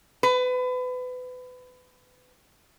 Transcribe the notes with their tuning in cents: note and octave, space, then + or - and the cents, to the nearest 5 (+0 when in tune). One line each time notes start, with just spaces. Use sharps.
B4 +30